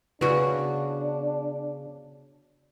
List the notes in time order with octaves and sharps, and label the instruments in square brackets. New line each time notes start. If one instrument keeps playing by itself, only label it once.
[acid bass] C#3 [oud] B3 F#4 [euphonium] D4